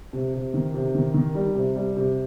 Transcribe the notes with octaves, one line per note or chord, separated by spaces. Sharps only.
C3
C3
D#3
C3
D#3
D#3
G3
C3
G3
C3